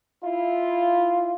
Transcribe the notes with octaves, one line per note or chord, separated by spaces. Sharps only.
E4 F4